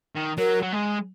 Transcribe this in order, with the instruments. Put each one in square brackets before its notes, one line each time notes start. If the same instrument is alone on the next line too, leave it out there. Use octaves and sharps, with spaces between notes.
[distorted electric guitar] D#3
[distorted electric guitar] F#3 [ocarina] A#4
[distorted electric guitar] F#3
G#3